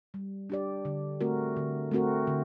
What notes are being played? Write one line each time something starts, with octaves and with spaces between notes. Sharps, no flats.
G3
D4 G4 D5
D3
A3 C4 F#4 A#4
D3
A3 C4 F#4 A#4
D3